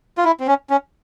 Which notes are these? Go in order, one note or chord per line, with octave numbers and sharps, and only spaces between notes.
F4
E4
C4
C#4
C#4